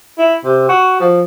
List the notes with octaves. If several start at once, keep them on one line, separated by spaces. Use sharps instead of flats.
E4
C3
F#4
F3